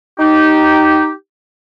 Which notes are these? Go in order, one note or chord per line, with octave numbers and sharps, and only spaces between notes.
D#4 G4